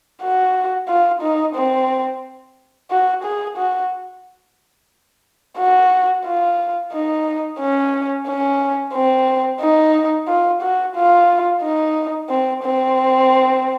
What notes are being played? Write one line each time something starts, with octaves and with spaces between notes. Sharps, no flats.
F#4
F4
D#4
C4
F#4
G#4
F#4
F#4
F4
D#4
C#4
C#4
C4
D#4
F4
F#4
F4
D#4
C4
C4